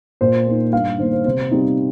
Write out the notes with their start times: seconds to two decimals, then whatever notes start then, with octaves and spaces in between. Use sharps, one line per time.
0.21 A#2 C5
0.46 A#3 D#4
0.73 G2 F5
0.98 D#3 A#3 C5
1.12 C5
1.25 C3 C5
1.51 G3 C4 D#4